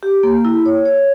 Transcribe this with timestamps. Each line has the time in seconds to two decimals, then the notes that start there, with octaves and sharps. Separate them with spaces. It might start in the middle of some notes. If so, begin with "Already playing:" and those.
0.03 G4
0.23 A#3
0.45 E4
0.66 C#5
0.85 C#5